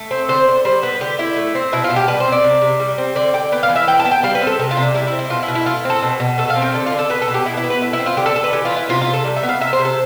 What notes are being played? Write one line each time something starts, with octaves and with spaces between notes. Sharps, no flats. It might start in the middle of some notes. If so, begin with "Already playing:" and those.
Already playing: A3
C4
D3 C5
D3
G3 C5
B3 B4
D3 G4
D3 E4
A3
C4
B2 E4
F4
B2
G4
G3 B4
C5
C4
D5
C3
C3
G3
C4
D3 D5
D3 G5
B3 G5
F5
E3
E5
E3 G5
A5
B3
G5
G3 F5
B4
C4
A4
C3 G4
F4
C3
D4
G3 E4
E4
C4
E4
B2 F4
E4
B2
E4
A3 F4
C4 A4
B2
B2
A3 A4
F5
C4
G5
D3 A4
F4
D3
A4
B3 B4
A4
B2
G4
B2 E4
E4
B3
B4
A3 E4
E4
C4
F4
D3 G4
A4
D3 A4
B4
E3 G4
F4
B3 E4
C3 F4
F4
C3
A4
G3
E5
B3
F5
C3 E5
C5
C3
A4